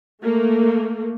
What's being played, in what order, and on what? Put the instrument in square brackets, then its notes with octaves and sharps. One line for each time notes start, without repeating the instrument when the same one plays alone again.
[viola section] A3 A#3